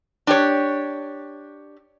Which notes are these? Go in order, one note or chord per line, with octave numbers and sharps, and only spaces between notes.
D4 G4 C#5